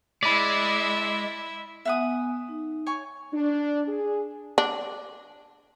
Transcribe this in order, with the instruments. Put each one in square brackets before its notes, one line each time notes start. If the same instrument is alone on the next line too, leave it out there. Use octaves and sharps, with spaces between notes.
[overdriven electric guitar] G#3 [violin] E4 E5 [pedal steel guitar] D5 [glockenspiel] B5 B6
[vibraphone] B3 G#5 [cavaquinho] E5 F#5 D#6
[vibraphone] D#4
[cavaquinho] C#5 G#5 C#6
[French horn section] D4
G#4
[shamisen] D4